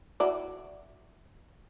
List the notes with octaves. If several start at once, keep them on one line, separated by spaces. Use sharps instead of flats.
E4 F#4 D5